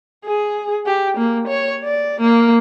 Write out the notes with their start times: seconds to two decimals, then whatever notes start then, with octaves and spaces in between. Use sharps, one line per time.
0.25 G#4
0.86 G4
1.18 A#3
1.48 C#5
1.84 D5
2.21 A#3